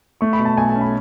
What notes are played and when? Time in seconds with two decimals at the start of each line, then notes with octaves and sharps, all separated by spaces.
0.21 A3 C#6
0.33 B5
0.39 B2
0.45 A5
0.57 B1 G#5
0.69 A5
0.75 C#4
0.81 B5